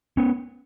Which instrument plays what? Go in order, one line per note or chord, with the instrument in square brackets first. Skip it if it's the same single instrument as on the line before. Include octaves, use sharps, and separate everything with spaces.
[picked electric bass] B3 C#4